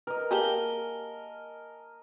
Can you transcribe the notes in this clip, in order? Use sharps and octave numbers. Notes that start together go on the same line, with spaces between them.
A#4 B4 D#5
A#3 G4 G#4 G#5 A5 G7